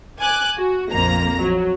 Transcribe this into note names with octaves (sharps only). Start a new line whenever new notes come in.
G#5 D6 F#6
F#4
A#1 F2 A#3 A#5 A#6
F#3